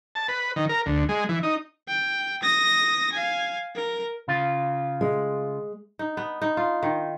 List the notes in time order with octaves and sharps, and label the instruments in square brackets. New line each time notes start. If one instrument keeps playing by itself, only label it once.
[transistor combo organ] A5
B4
D#3
A#4
D2
G#3
E3
D#4
[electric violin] G5
D#6 A#6
F5 G#5
A#4
[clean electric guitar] C#3 F4
[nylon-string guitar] G#3
[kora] D#4
B3
D#4
F4
D#3